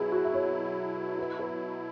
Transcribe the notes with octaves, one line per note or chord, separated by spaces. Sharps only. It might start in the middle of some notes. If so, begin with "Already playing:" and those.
Already playing: B2 F#3 E4 G#4 B4
F#4
E5
C#5
B4
B4